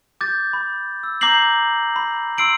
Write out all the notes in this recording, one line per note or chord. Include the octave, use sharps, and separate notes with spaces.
D6 G6 A6
B5
E6
A#5 D6 G6 A#6 C7 F#7
B5
C6 E6 C7 D7 F#7